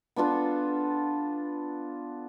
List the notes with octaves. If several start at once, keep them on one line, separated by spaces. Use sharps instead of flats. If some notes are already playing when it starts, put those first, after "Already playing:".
B3 D4 F4 A4